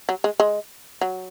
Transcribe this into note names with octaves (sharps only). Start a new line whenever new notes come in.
F#3
G#3
G#3
F#3